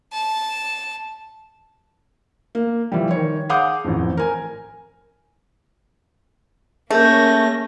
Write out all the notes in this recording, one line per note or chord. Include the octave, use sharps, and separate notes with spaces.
A5
A#3
E3 F3 G3
D#3 C#5
G#4 F5 F#5 D6 D#6 G6
A1 F2
A#4 G#5
A3 A#3 C#4 G#4 A#4 G6 A#6